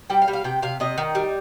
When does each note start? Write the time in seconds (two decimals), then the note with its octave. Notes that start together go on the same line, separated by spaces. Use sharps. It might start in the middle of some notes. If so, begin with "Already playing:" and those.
0.10 G3 G5
0.22 F5
0.28 G3
0.33 F5
0.44 C3 G5
0.62 C3 F5
0.80 C3 D#5
0.98 D#3
1.15 G3